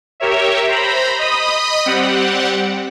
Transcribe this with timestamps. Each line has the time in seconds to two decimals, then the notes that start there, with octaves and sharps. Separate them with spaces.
0.20 G4 A#4 C#5 E5
0.68 C5 A#5 B5
1.19 D#5 B5 D#6
1.85 G3 C4 G4 F#5